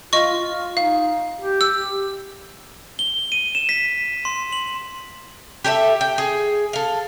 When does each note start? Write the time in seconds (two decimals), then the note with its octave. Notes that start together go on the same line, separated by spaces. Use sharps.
0.13 F4 D#5 C#6
0.34 F4
0.77 D#4 F5
1.41 G4
1.61 E6
2.99 G7
3.32 D#7
3.55 E7
3.69 B6
4.25 C6
4.53 F#7
5.64 G4 A4 D5 E5
6.01 G5
6.18 G#4
6.73 A4 F5